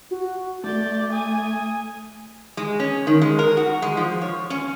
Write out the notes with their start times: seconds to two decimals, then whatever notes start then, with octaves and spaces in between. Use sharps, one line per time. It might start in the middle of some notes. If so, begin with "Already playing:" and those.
0.11 F#4
0.64 A3 D5 G6
1.13 G#5 D#6
2.57 G#3
2.80 C#4
3.07 D#3
3.22 G#3
3.39 A#4
3.57 F#4
3.82 G#3
3.97 F3
4.21 C#5
4.50 C#4